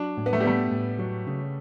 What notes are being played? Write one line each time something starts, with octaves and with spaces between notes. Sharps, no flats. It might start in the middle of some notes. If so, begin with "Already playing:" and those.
Already playing: F#3 D4
A2
B3
A3
G3
A3 B3
A2
F#3
C#3